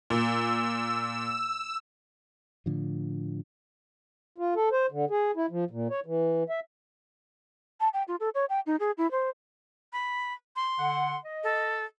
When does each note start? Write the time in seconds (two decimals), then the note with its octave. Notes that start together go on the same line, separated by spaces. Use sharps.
0.10 A#2 E6
2.66 A2 D3 F3
4.38 F4
4.55 A4
4.72 C5
4.91 D3
5.10 G#4
5.36 E4
5.50 F3
5.71 A#2
5.90 C#5
6.06 E3
6.50 E5
7.80 A5
7.94 G5
8.08 F4
8.20 A4
8.35 C#5
8.49 G5
8.66 D#4
8.80 G#4
8.98 E4
9.11 C5
9.93 B5
10.56 C6
10.78 D3 F#5
11.24 D#5
11.44 A4